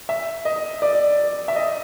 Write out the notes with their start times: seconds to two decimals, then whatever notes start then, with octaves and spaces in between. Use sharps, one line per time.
0.09 E5
0.45 D#5
0.82 D5
1.48 E5
1.56 D#5